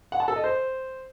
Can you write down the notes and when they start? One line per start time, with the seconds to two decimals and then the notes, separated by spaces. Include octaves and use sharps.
0.12 F#5
0.20 A5
0.28 A4
0.36 D#5
0.44 C5